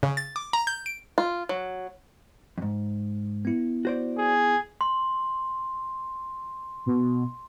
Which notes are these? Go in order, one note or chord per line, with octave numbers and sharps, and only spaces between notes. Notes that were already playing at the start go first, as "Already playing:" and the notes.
C#3
A6
D6
A#5
G6
D7
F4
F#3
F2 G#2
B3 E4
F#4 C5 D5
G#4
C6
B2